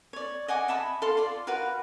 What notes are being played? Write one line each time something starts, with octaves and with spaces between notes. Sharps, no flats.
C#5 D5
D#5 F#5 G#5 D6
D#5 E5 A5 B5
A4 F5 C6
F4 D5 C6
F#4 A#4 B4 F5